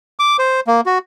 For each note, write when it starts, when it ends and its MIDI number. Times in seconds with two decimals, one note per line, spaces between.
0.19 0.37 86
0.39 0.60 72
0.67 0.81 58
0.86 0.98 66